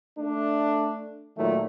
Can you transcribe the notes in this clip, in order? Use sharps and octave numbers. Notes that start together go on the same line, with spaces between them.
A3 D4
A#2 D#3 F#3 A3